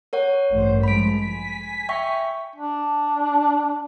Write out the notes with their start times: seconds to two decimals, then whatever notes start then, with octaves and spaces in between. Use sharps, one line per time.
0.13 A#4 C#5 F#5
0.51 A1 G2 C5
0.84 F3 G#3 B5 B6 D7
1.18 G#5 B6
1.89 E5 G5 C#6
2.56 D4